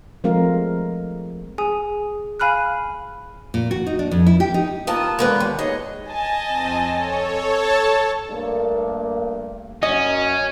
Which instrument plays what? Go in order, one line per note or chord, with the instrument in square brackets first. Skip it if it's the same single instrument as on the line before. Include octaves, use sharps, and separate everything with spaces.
[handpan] F3 G#3 A3 C4 A#4 F5
[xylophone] G#4 G#5 D#6
F5 G#5 B5 F6 F#6
[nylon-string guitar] A#2
F#4
D#4
D4
F2
E4
G4
D#4
[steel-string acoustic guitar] A#3 B3 A5 [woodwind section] F4 D#6
[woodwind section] D3 E3 G#3 [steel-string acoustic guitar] A#3 B3 B4
[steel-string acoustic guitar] D#2
[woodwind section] D#4 G#4 C#5 [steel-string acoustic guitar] D#5
[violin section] D#5 G#5 A5
[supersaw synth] F2 C4
A4 C#5
[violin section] A5
[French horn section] G2 A3 A#3
[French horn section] F#2 [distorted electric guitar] C#4 [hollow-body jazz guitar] D#5